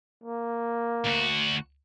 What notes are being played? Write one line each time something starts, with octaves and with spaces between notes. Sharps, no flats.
A#3
D2 F#4